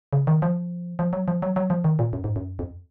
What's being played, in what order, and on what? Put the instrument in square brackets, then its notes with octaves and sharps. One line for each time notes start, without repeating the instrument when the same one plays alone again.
[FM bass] C#3
D#3
F3
F3
F#3
F3
F#3
F#3
F3
D#3
A#2
F#2
G#2
F#2
F2